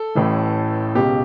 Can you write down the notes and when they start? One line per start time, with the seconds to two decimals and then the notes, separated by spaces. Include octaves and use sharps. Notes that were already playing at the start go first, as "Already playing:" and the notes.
Already playing: A4
0.15 A1 A2 E3
0.95 C#2 B2 G4